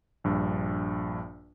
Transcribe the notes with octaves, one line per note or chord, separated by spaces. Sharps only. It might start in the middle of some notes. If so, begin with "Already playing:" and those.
A#1 G2